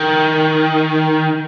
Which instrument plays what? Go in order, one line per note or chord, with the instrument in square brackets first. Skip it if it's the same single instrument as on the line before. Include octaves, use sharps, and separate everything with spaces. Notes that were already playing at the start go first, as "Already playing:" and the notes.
Already playing: [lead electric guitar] D#3